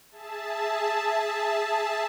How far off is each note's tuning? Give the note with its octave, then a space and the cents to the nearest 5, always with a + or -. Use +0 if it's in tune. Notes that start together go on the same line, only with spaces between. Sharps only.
G#4 +0 E5 +0 A5 +0